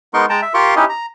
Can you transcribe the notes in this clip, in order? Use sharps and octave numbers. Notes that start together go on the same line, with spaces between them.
G#3 B3 D#4 A#4 C6 C#6
G#3 G5 A5 A#5
E5
F4 G4 A#4 F5 C6 C#6
C#4 D#4 E4 G4 D#5
A#5